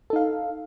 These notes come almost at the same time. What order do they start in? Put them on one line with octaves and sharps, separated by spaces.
A4 D#4 F5